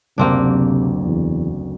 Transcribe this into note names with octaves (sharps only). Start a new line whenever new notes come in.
F#1 D2 C3 A#3 C4 D4
E2